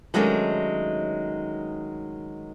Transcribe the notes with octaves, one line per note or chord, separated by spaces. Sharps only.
D#3 F#3 G#3 A3 C#4 D4